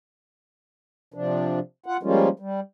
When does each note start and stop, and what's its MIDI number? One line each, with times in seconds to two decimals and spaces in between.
1.14 1.60 48
1.14 1.60 53
1.14 1.60 62
1.86 1.97 65
1.86 1.97 78
2.03 2.29 53
2.03 2.29 55
2.03 2.29 56
2.03 2.29 58
2.03 2.29 61
2.03 2.29 65
2.40 2.60 55